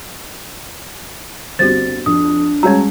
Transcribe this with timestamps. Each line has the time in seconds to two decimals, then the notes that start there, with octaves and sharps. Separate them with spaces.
1.59 G1 C4 F#4 G4 C5 A6
2.06 F2 D4 D#6
2.63 G3 G#3 C#4 F#4 G#4 C#5 A#5